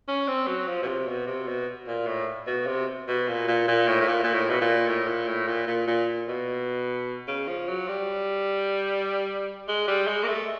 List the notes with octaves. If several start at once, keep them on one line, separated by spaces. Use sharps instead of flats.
C#4
C4
F#3
F3
B2
C3
B2
C3
B2
A#2
A2
B2
C3
B2
A#2
A#2
A#2
A2
A2
A#2
A#2
A2
B2
A#2
A2
A#2
A2
A#2
A#2
A#2
B2
C#3
F3
F#3
G3
G#3
G3
G#3
A#3
A3